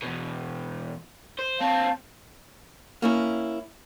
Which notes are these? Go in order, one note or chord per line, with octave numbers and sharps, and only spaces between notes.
E2 B2
C5
C4 C#5 F5 A5
A#3 C#4 E4